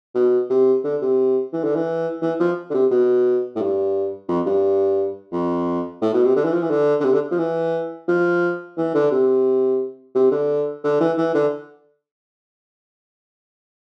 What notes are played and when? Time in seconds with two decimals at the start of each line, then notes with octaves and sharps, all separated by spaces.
0.15 B2
0.50 C3
0.84 D3
1.02 C3
1.53 E3
1.64 D3
1.76 E3
2.22 E3
2.40 F3
2.70 D3
2.74 C3
2.91 B2
3.56 A2
3.59 G2
4.28 F2
4.46 G2
5.32 F2
6.01 A2
6.13 B2
6.24 C3
6.36 D3
6.44 E3
6.53 F3
6.62 E3
6.70 D3
7.00 D3
7.05 C3
7.13 D3
7.31 F3
7.38 E3
8.08 F3
8.77 E3
8.94 D3
9.11 C3
10.15 C3
10.31 D3
10.84 D3
11.00 E3
11.18 E3
11.35 D3